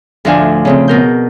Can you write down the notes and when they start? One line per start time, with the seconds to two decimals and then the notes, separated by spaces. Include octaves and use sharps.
0.25 D2 A2 F3 D4 G#5
0.65 C#3 A3 C4
0.88 B2 A#4 G6